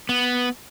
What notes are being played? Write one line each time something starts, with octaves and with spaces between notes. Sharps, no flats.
B3